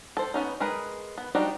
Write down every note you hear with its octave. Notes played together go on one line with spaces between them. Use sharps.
A4 C5
B3 C#4 D#4
G#3 G#4 A#4 B4
B3
F3 G3 D4 D#4 F#4